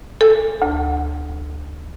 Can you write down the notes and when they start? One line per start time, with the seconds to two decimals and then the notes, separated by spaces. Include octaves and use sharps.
0.21 A4
0.62 D2